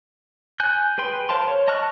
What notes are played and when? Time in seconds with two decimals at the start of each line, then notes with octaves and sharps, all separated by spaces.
0.60 G#5 F#6 G6
0.98 G#4 B4 G5 C6
1.29 A#4 C5 F5 A5 C6
1.48 C#5
1.68 D#5 A5 C#6 F6 F#6